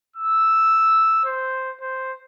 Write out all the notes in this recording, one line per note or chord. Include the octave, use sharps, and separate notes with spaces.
E6
C5
C5